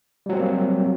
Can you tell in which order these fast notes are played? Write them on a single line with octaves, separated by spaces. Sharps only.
G3 F#3 C4 A#3